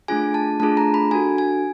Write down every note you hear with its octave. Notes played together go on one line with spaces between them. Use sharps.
A3 D4 F4 G#4 G#5
A5
A3 D4 F4 G#4 A5
A#5
B5
D4 F#4 A4 G#5
G#5